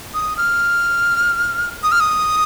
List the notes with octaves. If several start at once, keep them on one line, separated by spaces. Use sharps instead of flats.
D#6
F6
D#6
F6
D#6